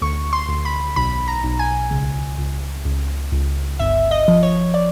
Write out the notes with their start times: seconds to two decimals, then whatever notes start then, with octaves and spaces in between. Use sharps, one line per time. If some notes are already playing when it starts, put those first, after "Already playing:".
0.02 D2 C#6
0.33 C6
0.48 D2
0.65 B5
0.96 B1 B5
1.28 A#5
1.44 B1
1.59 G#5
1.91 C#2
2.38 C#2
2.85 C#2
3.32 C#2
3.79 G1 E5
4.11 D#5
4.28 F3
4.43 C#5
4.74 D5